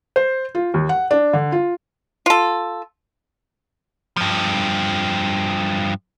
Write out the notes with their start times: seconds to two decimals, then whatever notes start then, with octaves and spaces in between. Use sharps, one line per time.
0.16 C5
0.55 F4
0.74 D#2
0.89 F#5
1.11 D4
1.33 D3
1.52 F4
2.26 F4 A4
4.17 G2 F3